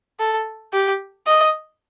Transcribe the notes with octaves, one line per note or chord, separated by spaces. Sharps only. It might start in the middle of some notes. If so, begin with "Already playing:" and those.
A4
G4
D#5